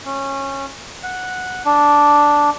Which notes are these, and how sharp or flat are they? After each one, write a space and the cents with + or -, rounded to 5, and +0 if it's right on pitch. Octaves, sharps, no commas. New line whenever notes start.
C#4 -20
F#5 -10
D4 -5